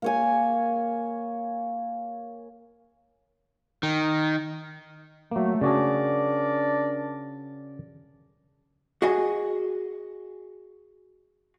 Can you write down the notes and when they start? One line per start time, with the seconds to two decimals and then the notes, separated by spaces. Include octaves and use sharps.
0.02 A#3 C#5 G#5
3.83 D#3
5.31 F#3 A3 A#3
5.61 C#3 D4 F#4 G#4 A#4 D5
9.02 F#4 G#4 D#5 G#5